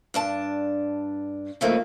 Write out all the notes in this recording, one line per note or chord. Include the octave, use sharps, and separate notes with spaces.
G2 D4 A5
C#3 F3 A3 A#3 C4 D#4